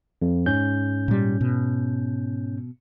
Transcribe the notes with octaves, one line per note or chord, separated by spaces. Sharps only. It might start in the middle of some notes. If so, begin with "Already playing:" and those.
F2
G#2 C#4 G6
A#2 G3
B2